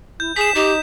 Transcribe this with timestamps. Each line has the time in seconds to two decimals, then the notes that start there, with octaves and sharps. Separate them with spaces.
0.20 E4 G6
0.36 G#4 G#5 B6 E7
0.55 D#4 G4